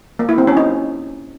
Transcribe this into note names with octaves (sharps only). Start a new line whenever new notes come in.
A#3
E4
C4
C#4
D#4